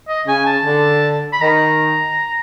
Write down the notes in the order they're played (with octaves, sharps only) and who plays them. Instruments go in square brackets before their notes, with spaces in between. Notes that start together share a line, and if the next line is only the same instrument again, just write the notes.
[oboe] D#5
[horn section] C#3 [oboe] G#5
[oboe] A5
[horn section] D3
[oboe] B5
[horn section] D#3 [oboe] A#5